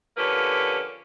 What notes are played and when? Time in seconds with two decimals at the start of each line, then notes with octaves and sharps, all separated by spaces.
0.17 D3 F3 A#3 C#4 G4 B4